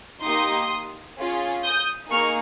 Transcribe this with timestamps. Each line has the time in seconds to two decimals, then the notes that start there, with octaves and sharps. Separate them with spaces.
0.24 A#3 D#4 G4 C6 D#6
1.18 C#4 F4 G#4
1.64 D#6 G6
2.11 A#3 D#4 G#4 C#6 F6